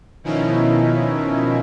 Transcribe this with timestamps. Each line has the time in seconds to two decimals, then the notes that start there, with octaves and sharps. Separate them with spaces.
0.24 B2 D#3 F3 C#4 D#4 E4